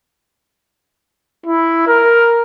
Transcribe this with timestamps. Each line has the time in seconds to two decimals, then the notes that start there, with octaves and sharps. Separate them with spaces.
1.46 E4
1.87 A#4